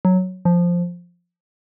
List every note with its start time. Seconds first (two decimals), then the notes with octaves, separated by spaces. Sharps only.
0.05 F#3
0.45 F3